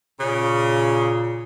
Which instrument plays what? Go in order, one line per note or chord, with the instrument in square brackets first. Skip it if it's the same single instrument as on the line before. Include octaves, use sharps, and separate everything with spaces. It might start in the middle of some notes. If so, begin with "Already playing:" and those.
[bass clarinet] A#2 [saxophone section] C#3